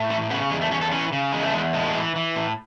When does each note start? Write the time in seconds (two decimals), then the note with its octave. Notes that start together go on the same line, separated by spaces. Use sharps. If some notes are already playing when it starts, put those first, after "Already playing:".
Already playing: A2
0.10 E3 A3
0.30 C#3 B3
0.50 E2 G#3
0.61 A3
0.71 E2 C#4
0.81 A4
0.92 E3 C#4
1.13 C#3
1.32 E2 G#3
1.43 A3
1.53 E2 G#3
1.73 A2 G#3
1.95 E3
2.16 E3
2.35 A2